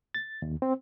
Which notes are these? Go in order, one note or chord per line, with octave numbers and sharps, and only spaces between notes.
A6
D#2
C4